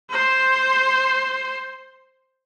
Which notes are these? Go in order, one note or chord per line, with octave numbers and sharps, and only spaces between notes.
C5 C6